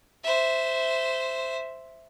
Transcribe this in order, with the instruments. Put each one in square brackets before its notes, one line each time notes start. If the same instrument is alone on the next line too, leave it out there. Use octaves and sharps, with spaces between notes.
[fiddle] C5 E5